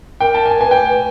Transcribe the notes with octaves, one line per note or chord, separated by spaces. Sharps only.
A#4 G5
A5
G#5
B4 G#5
G5